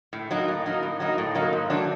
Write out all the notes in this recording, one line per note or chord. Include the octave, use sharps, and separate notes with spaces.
A2
F#3 A#3 D#4
A2
F#3 A#3 D#4
A2
F#3 A#3 D#4
A2
F#3 A#3 D#4
G#2
D#3 F#3 A3 D4